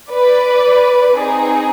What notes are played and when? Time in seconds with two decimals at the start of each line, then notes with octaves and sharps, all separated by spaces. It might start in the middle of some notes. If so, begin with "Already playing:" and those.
0.12 B4 D5
1.14 C4 D#4 G#4